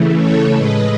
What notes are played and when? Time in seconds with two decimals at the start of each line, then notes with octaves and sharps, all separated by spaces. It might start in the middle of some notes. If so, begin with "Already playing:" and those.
Already playing: C#3 E3 A3
0.17 A4 C#5
0.54 A2 G#3 B4 D#5